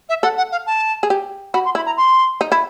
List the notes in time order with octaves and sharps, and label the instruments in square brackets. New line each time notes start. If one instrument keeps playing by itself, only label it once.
[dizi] E5
[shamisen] A4 [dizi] F#5
[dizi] F#5
F5
A5
[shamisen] G#4
G4
[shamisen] F#4 [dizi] B5
[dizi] C6
[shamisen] E4 [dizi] B5
[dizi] A#5
C6
[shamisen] D#4
E4